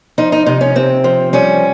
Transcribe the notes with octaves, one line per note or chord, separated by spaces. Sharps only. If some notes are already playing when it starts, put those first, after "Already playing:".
F3 D#4
D#4
C3 D#4
C#4
C3 C4
F3
G3 C#4